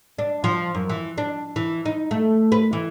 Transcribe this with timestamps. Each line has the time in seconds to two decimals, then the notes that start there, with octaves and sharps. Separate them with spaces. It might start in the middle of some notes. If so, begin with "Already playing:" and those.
0.18 D4
0.44 F3
0.75 F#2
0.89 E3
1.18 D4
1.56 E3
1.85 D#4
2.11 A3
2.52 B4
2.73 E3